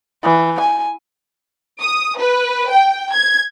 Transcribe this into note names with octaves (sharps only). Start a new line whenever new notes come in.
E3
G#5
D#6
B4
G5
G#6